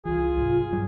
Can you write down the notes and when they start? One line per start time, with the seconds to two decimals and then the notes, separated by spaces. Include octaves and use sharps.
0.05 C2 E3 F4 G#4
0.37 B1 G#2 C3
0.72 G2 F#3 G3